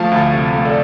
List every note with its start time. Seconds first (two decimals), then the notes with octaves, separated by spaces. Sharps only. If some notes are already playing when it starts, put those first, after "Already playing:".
Already playing: F3 A3 F5 A5
0.12 D2
0.33 C3
0.54 A3
0.65 A4 D5